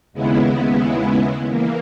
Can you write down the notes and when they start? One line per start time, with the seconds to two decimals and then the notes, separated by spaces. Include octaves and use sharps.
0.13 D#2 C#3 G#3 B3 E4
1.49 E3 A#3